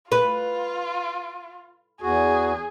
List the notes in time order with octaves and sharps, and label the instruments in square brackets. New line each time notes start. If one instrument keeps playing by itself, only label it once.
[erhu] F4 [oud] B4
[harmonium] E2 F#4 [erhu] G#4